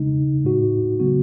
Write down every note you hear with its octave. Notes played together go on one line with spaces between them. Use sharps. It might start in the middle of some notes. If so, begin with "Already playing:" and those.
Already playing: C#3 G#3 D#4
A2 G#3 D#4 F#4
C#3 F#3 B3 F#4